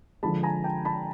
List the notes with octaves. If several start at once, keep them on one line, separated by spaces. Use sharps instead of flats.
D3 F3 G#3 A5 B5
G#5 A#5
G5 A5
A5 B5